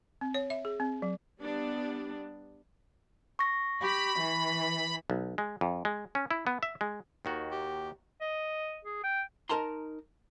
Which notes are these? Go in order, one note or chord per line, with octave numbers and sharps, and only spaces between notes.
C4
C#5
E5
G#4
C4
F#3
G3 B3 D4
C#6 A#6
G4 B5
E3
B1
G#3
F2
G#3
C#4
E4
B3
E5
G#3
D#2 D#3 F#4
G4
D#5
G#4
G5
D#4 A#4 A5 A#5 C6